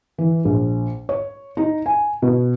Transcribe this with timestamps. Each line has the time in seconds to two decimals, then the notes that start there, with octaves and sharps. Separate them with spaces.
0.18 E3
0.45 A#1
1.09 C#5
1.57 D#4
1.86 G#5
2.22 B2